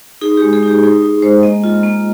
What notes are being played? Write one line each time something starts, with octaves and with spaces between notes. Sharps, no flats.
D#4 G#4
G#3 G4
G#4
D#4 G4
D#4 G#4
D#4
G#3 C5
A#3 D#5
F4
A#3